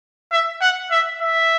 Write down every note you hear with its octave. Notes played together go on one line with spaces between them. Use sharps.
E5
F#5
E5
E5